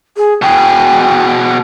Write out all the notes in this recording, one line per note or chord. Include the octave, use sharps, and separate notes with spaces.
G#4
B2 G#4 G5